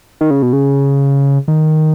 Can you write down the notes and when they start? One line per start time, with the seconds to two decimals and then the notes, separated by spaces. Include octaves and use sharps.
0.21 D#3
0.31 C#3
0.42 B2
0.53 C#3
1.48 D#3